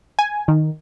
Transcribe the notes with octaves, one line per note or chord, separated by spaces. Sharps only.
G#5
D#3